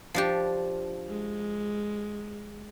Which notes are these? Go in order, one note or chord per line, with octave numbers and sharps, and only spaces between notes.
F3 D4 G4
G#3